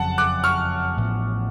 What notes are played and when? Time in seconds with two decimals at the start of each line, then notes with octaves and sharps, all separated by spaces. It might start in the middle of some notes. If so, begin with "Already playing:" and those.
Already playing: F#1 F2 C#3 F#3 F#5 A5
0.18 D6 F#6
0.44 C#6 F6
0.97 A1 A2 F3 B3